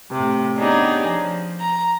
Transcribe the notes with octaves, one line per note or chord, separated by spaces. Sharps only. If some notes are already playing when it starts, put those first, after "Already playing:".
A2 C3
B3 D4 D#4 G4 G#4 C#5
F3
A#5